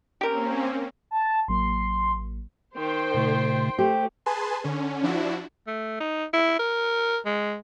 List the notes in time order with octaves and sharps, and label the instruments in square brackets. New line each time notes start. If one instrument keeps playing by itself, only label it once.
[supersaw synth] A#3 C4 C#4 [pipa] G4 A#4
[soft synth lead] A5
[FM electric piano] A1 F#3 A#3 [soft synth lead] C6
[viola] D#3 [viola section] C5 G5 C6
[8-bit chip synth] A#2 C#3 A3
[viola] A3 [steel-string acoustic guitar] G4 [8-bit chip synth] C5
[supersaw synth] G#4 B4 G#5 A5 C6
D3 C#4
F3 D4 E4 F#4
[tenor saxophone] A3
D#4
E4
A#4
G#3